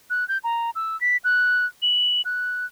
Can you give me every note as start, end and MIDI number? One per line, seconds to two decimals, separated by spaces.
0.10 0.27 90
0.29 0.38 91
0.44 0.70 82
0.75 0.99 88
1.01 1.17 95
1.24 1.66 90
1.82 2.22 102
2.25 2.66 90